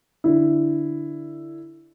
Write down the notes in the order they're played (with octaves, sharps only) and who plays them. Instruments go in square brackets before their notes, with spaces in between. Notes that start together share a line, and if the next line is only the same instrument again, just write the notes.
[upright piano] D3 E4